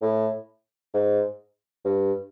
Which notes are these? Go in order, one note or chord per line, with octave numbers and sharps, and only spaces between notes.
A2
G#2
G2